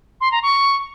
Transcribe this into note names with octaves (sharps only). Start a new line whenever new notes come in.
C6
A#5
C#6